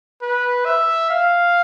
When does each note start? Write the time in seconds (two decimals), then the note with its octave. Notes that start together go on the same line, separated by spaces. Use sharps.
0.22 B4
0.65 E5
1.10 F5